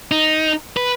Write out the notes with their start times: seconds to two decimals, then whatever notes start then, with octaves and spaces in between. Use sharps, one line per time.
0.11 D#4
0.77 B4